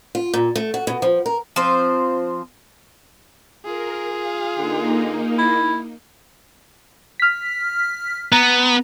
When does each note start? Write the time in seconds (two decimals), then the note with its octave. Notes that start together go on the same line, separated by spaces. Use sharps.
0.15 F4
0.34 A#2
0.56 A3
0.74 F#4
0.87 B2
1.02 F3
1.26 A#4
1.56 F3 C4 C5
3.65 F4 G#4 A#4
4.12 F5
4.58 D3 A#3 D#4
5.38 E4
7.20 F6 B6
8.32 B3 A#5